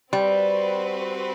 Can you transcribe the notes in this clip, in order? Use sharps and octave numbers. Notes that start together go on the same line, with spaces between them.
G3 C4 F#4 B4